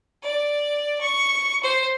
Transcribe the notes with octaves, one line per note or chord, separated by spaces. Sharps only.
D5
C#6
C5